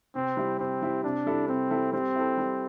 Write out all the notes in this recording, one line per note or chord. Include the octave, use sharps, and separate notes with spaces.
C3 C4
G3 E4
C3 C4
G3 E4
C3 D4
G3 E4 A4
C3 C4
G3 E4 A4
G3 C4
E4 A4
G3